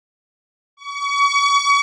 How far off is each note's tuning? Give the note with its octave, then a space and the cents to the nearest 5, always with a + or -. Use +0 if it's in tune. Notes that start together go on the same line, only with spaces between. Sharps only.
C#6 +35